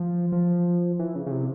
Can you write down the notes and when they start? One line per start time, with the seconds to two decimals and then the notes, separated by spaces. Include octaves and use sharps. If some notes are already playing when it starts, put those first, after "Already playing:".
Already playing: F3
0.32 F3
0.99 E3
1.15 C#3
1.26 C#3
1.31 C3